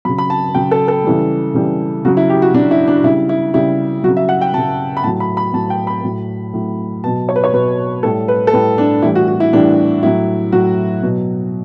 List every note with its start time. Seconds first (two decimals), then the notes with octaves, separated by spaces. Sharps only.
0.05 C#3 F#3 B5
0.18 B5
0.30 A5
0.54 C#3 F#3 G5
0.71 A4
0.88 A4
1.04 C#3 E3 G3
1.54 C#3 E3 G3
2.05 C#3 F#4
2.07 F#3
2.17 E4
2.30 G4
2.42 F#4
2.54 C#3 F#3 D4
2.71 E4
2.88 D4
3.04 C#3 G3 E4
3.29 E4
3.54 C#3 G3 E4
4.04 F#3 F#4
4.09 C#3
4.17 E5
4.29 F#5
4.41 G5
4.54 C#3 F#3 A5
4.97 B5
5.04 A2 A5
5.07 F#3
5.20 B5
5.37 B5
5.54 A2 F#3 A5
5.70 G5
5.87 B5
6.04 A2 F#3
6.54 A2 F#3
7.04 B2 A5
7.08 F#3
7.29 C#5
7.36 B4
7.44 C#5
7.53 B2 F#3 B4
8.03 A2 G3 A4
8.28 B4
8.47 A4
8.53 A2 G3 B4
8.78 D4
9.02 A2 E3 G3 E4
9.15 F#4
9.28 F#4
9.40 E4
9.53 A2 E3 G3 D4
10.03 A2 F#3 E4
10.52 A2 F#3 F#4
11.03 B2 F#3